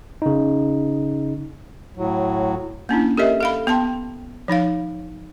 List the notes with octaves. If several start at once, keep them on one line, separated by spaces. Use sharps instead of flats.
C#3 D#4
A2 F#3
A#3 C#4 D4 E4
G4 A4 A#4 C#5 D#5 E5
A4 F5 B5
B3 G5 A5 C6
F3 D#4 C#5 F5